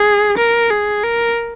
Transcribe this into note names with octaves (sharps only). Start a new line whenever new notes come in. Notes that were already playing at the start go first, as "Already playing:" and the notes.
Already playing: G#4
A#4
G#4
A#4